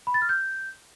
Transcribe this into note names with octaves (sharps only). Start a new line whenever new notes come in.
B5
A6
F6
G6